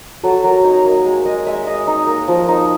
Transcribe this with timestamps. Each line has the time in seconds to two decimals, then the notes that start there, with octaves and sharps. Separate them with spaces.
0.23 F#3 A4
0.44 F#3 A#4
0.64 D#4 C#5
0.85 A#3 D#5
1.05 G#3
1.25 G#3 D#5
1.46 G#3 E5
1.67 G#3 D#5
1.87 D#4
2.07 A#3
2.28 F3
2.48 D#4